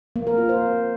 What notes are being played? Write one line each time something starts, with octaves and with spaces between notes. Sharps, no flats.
A#3
A#4
F4
C5